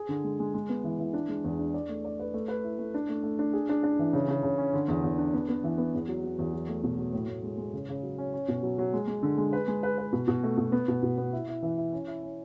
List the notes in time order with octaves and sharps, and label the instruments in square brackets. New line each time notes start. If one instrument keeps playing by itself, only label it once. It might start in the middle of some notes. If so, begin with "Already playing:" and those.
Already playing: [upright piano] G#4
D3
G#3
G#3
G#3
B3
E3
E3
D4
G#3
E2
D4
D5
A3
D5
B4
A3
B4
E4
A3
D4
A3
A3
D4
G#4
D4
D4
E3
C#3
C#3
C#3
C#4
D3
E2
E2
D4
B3
B3
E3
B3
E2
F#3
F#3
E2
F#3
A3
B2
F#3
A2
A2
G#3
G#3
C#3
C#3
F#3
C#4
C#4
B2
F#3
F#3
G#3
G#3
D3
G#3
B4
G#3
B4
B4
B2
B2
A3
B2
B3
B2
B2
B3
E4
E4
E3
E4
C#4
E4
C#4